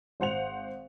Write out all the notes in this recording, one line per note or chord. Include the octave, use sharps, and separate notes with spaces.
G#1 C5 F#5 F7